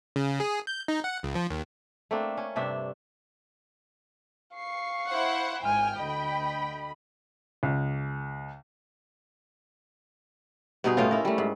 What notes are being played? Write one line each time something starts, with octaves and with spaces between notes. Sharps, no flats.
C#3
G#4
G6
D#4
F#5
C#2
F3
D#2
A3 A#3 C4 D4
C#4
G2 C3 D4 E5
F5 C#6 C7
E4 C5 F#5
G#1 G#2 G5 G#5 F6
D2 D#5 B5
C#2
G2 B2 D#4 G#4
A2 C#4 F4
E4 A#4
G3 A3
G#2